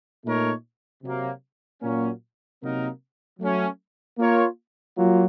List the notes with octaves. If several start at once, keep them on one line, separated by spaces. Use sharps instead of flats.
A#2 A3 D#4 A#4 C#5
C3 F#3 A#3
A#2 F#3 A#3 C#4
C3 F#3 A#3 D#4 A#4
F#3 A3 C#4
A#3 F4 A#4 C#5
F#3 A#3 F4